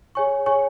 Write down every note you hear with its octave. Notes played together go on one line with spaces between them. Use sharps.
G#4 C#5 G#5 C#6
G#4 C#5 G#5 C#6